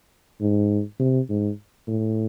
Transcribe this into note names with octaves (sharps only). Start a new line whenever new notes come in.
G#2
C3
G#2
A2